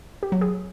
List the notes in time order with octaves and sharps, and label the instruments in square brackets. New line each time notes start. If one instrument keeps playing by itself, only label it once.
[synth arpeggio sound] G4
F#3
G#4